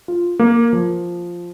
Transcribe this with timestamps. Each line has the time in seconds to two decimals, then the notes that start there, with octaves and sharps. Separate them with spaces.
0.08 F4
0.39 A#3
0.73 F3